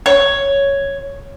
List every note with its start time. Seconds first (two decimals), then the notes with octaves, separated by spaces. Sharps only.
0.06 C#5